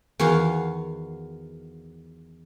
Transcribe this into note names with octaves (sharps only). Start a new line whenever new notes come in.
E2 D#3 F#4 F5